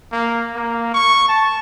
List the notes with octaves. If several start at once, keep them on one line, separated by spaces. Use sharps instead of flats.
A#3
A#3
C#6
A5